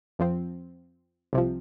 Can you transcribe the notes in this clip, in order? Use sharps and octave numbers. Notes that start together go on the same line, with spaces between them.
F2 F3 C4
C2 C3 F3